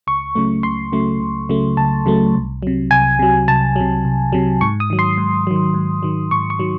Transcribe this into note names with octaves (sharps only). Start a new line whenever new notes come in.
C#2 C#6
C#3 F#3 A3
C#2 C6
C#3 F#3 A3
C#2
C#3 F#3 A3
C#2 A5
C#3 F#3 A3
C2
C3 F#3
C2 G#5
C3 F#3
C2 A5
C3 F#3
C2
C3 F#3
G#2 C#6
D#6
D#3 F#3
C6
G#2
D#3 F#3
G#2
D#3 F#3
G#2 C#6
C#6
D#3 F#3